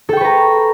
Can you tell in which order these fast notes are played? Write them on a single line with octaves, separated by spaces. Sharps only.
A4 G5 C#6 B4 A#5